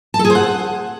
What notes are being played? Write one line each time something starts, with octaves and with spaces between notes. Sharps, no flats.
A5
A4
G#4
C5
F#5